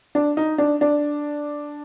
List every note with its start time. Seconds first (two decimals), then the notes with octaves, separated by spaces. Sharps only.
0.15 D4
0.37 D#4
0.58 D4
0.81 D4